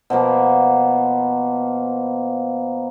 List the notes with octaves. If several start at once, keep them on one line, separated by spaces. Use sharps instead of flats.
B2 F3 A#3 B3